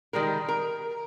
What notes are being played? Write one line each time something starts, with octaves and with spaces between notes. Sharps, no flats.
D#3 G3 G#3 A#4
A#4